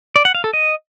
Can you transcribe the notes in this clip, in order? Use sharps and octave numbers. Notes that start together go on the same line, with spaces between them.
D5
F#5
F5
A4
D#5